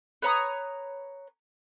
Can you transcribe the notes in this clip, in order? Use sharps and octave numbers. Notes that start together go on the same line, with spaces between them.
B4 C#5 A#5 D#6